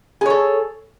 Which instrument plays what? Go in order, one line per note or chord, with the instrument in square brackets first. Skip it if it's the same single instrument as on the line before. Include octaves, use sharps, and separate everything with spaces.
[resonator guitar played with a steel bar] G#4
C#5
A4